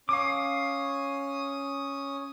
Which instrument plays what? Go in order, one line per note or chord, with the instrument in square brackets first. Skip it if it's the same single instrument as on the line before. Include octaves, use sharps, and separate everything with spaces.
[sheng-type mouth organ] C#4 D#6 [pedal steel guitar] F5 D6